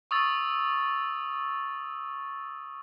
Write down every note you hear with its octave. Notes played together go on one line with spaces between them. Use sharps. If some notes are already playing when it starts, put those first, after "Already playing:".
C#6 D#6 E6 A6